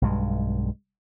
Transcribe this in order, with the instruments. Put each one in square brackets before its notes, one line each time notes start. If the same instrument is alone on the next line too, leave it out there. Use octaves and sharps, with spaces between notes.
[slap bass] B1 G2 G#3